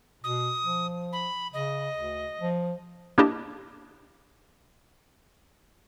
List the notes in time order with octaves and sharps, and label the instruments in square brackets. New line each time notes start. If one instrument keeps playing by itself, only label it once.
[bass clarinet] B2 [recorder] D#6
[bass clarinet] F3
[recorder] B5
[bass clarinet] C#3 [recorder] D#5
[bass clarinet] D2
F3
[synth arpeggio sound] A#3 D4 E4 G4 D#5 A5